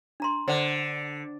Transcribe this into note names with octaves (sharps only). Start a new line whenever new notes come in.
D4 A#5 C6
D3 C5 D5 F#5